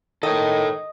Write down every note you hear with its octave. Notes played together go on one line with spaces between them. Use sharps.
D#3 A4 C#5 D#5